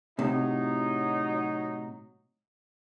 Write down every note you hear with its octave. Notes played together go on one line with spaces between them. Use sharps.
A2 C3 F#3 D#4